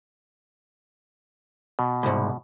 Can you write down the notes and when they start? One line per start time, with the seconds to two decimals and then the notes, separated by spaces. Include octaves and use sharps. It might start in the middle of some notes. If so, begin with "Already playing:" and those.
1.79 B2
2.03 C2 G#2